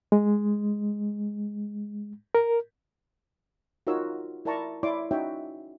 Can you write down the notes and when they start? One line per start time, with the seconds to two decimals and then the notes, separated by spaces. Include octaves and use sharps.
0.12 G#3
2.35 A#4
3.87 D#4 F4 F#4 A#4 C#5 E6
4.45 E4 A#4 D5 A5 A#5 C#6
4.83 E4 C#5 D5 C6 D6
5.11 C#4 D#4 F#4 C#5 E5 G5